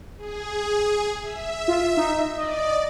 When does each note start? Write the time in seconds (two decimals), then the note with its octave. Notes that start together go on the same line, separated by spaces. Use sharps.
0.17 G#4
1.22 E5
1.68 F4
1.97 D#4
2.37 D5 D#5